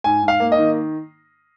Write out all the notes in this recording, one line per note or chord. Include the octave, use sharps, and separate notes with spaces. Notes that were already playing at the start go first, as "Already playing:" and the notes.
G#2 G#5
G#2
F5
A#3
D#5
D#3